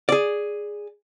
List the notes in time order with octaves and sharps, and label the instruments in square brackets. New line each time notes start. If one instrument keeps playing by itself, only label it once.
[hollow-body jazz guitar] G#4 D5